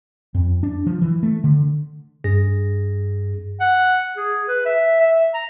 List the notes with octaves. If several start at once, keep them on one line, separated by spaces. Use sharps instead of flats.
F2
D4
F3
E3
A3
D3
G2 G#4 A#6
F#5
G#4
B4
E5
E5
A#5